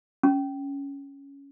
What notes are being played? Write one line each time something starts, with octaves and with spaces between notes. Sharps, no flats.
C#4